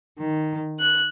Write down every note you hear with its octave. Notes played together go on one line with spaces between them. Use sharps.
D#3
F#6